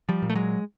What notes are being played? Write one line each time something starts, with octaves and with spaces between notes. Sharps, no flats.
F3 G3
A#2
A3
F#3 G#3